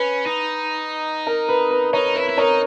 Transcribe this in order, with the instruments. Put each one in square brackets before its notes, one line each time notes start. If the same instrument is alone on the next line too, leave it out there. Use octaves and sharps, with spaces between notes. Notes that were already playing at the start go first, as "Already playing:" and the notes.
Already playing: [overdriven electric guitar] C#4 [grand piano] B4
[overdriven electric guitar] D#4
[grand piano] A#4
B4
B4
[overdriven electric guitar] D#4 [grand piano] A#4 C#5
[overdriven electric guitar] E4 [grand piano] B4
[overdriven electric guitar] E4
[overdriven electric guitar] D#4 [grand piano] A#4 C#5